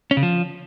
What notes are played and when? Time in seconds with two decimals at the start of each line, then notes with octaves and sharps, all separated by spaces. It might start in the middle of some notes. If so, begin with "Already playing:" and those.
0.11 C#4
0.17 C#3
0.23 F3